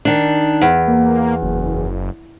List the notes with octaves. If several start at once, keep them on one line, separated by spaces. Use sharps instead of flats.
D#3 D4
E2
A#3
F#1